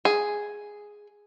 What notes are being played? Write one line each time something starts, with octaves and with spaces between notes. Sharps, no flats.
G#4